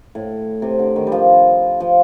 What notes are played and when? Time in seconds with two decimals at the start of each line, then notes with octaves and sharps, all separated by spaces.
0.15 A2
0.62 C3
0.79 D3
0.96 D#3
1.07 G3
1.12 F3
1.80 F3